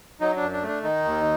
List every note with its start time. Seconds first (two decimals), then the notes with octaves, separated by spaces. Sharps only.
0.21 F#3 D#4
0.37 D4
0.42 F#2
0.52 D4
0.63 A3
0.68 D4
0.83 D#3 D#4
1.05 D#2